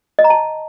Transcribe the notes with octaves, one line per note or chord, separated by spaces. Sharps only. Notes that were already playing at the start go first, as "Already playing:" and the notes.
D#5
A#5
A5